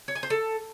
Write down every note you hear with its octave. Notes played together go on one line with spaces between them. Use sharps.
C#5
G#5
C5
A4